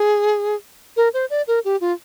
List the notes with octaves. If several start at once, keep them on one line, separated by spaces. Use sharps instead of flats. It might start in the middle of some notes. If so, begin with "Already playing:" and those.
Already playing: G#4
A#4
C5
D5
A#4
G4
F4